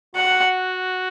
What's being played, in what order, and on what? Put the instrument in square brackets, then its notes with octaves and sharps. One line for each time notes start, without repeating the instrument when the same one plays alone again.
[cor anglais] F#4 [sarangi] F#5